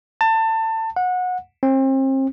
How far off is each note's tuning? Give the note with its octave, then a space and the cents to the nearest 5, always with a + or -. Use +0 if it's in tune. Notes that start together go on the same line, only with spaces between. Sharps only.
A5 +25
F#5 -25
C4 +35